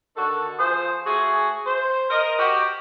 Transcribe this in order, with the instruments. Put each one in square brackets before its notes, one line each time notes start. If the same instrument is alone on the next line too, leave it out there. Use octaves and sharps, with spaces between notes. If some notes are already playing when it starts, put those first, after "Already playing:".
[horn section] D3 D#3 F#4 A4
F3 G#4 C5
A3 F#4 G#4
C5
A#4 D#5
F#4 G4